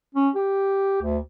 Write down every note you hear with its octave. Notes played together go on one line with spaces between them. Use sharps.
C#4
G4
D2